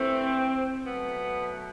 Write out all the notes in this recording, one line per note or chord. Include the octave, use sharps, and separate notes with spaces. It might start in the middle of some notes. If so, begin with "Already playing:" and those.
Already playing: G2 E3 A3 C4
B2 F#3 A3 B3